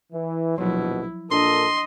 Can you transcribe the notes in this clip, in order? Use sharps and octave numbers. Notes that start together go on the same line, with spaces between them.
E3
A#1 D#2 B2 F3 F#3 E4
A#2 D4 A4 A#4 D#5 C6